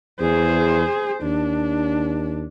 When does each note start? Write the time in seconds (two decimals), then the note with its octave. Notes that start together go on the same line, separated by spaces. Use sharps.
0.21 E2 G#4 C5
1.23 D#2 D4